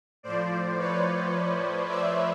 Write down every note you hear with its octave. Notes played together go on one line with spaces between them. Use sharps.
A2 F3 C5 D5
B4 C#5
D5 E5